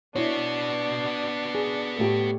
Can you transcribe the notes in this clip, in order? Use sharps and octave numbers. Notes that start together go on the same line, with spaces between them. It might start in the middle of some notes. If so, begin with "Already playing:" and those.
B3 D4 E4 F#4 C#5
G#4
A2 A3 G4 A4